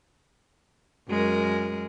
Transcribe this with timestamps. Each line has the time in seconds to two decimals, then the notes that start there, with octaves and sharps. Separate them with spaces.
1.09 F#2 G#3 A#4